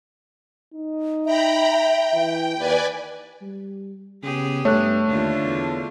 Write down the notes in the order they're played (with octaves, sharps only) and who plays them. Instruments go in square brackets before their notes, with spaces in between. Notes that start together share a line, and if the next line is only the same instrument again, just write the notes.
[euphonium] D#4
[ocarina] E5 [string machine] G5 A#5 B5
[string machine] G5
[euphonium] E3
[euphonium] D#2 [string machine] B4 D5 G#5
[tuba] G3
[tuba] C#3 [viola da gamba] B3 G4 G#4
[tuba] G2 [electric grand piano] A3 [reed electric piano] C#5 F#6
[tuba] D#2 [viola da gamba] D3 D4 F4
[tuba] E2